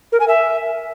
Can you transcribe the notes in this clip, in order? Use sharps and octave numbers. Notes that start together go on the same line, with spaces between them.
A#4
G#5
E5